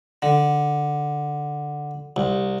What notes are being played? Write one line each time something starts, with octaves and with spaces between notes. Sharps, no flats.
D3
C2